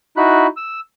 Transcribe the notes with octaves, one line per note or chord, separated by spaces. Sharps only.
D#4 E4 F#4 B5 F#6
E6